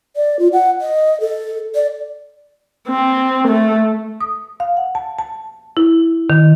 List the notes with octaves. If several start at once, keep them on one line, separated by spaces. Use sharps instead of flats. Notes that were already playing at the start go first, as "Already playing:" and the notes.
D5
F4
F#5
D#5
A4
D5
C4
A3
D#6
F5
F#5
A5
A5
E4
D#3